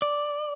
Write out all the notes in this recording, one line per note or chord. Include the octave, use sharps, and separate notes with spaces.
D5